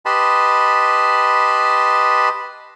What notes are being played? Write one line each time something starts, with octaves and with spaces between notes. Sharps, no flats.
G4 B4 D#5 A5 B5 C6